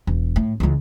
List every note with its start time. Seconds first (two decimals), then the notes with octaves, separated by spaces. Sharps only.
0.07 E1
0.36 A2
0.60 C#2 E3